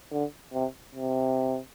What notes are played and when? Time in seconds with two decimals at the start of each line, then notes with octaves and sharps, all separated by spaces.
0.11 D3
0.53 C3
0.95 C3